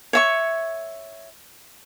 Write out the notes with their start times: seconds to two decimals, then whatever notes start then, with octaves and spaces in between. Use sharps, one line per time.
0.13 C#5 E5 C#6